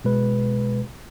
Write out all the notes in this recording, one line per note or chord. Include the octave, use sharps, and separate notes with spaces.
B2 G#3 B4